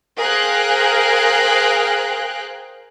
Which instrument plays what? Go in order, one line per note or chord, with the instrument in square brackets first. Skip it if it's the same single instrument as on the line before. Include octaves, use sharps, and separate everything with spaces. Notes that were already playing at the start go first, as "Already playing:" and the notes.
[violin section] G#4 A#4 C5 F5 G5 F#6